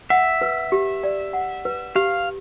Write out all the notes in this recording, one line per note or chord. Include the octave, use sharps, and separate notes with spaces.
E5 F#5
B4
G4
D5
F#5
B4
G4 F5